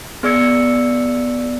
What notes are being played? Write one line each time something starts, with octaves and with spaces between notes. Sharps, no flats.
B3 G#4 D5 E6 G#6 C#7